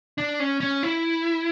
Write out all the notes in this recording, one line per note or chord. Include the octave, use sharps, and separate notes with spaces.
D4
C#4
C#4
E4